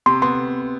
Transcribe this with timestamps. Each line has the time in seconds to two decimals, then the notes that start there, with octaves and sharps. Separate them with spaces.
0.06 C3 C6
0.22 B3 C6